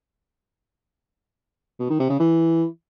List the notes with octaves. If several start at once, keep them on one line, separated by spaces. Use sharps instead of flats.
B2
D#3
C3
C#3
E3